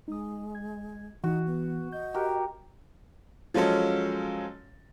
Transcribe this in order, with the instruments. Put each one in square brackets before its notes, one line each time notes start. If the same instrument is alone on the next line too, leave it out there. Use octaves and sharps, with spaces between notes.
[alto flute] G#3 [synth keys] D#4 D#6
[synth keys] G#6
[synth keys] E3 [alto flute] D#4 [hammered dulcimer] F#4
[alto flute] B3
[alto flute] D#5 [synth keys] G6
[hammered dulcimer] F#4 G4 A#4
[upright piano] F3 F#3 G#3 C#4 A4